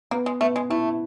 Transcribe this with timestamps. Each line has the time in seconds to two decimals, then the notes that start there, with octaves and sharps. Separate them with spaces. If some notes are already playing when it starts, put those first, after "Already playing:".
0.11 A#3 B3
0.26 G#3
0.41 A3 B3
0.56 G#3
0.70 A3 E4